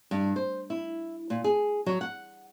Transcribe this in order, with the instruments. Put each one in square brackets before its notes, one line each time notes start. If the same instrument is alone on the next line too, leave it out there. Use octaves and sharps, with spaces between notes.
[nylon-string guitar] G2
C5
E4
A#2
G#4
F#3
F#5